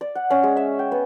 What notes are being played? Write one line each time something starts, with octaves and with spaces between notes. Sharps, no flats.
D5
F#5
C#4
G#3
E5
G5
B3